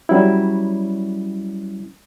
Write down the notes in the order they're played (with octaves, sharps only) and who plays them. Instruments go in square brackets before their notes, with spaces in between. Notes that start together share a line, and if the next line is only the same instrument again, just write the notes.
[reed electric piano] F#3 G3 C#4 E4